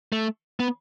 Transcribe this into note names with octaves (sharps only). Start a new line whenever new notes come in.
A3
B3